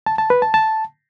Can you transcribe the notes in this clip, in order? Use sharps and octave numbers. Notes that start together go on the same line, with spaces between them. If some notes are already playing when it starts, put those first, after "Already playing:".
A5
A5
B4
A5
A5